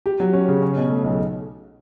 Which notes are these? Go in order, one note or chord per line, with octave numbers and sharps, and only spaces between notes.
G4
F#3
C#4
C#3
C#4
B2
A3
B1